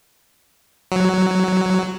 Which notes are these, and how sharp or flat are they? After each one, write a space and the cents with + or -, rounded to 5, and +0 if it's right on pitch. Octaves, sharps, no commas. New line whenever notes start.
F#3 +5